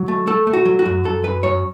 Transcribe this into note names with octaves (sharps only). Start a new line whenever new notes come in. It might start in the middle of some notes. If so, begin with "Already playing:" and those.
Already playing: F#3
A3
A3 A4
A3
F#4
F#3
F#4
F#2
F#2 A4
F#2 B4
F#2 C#5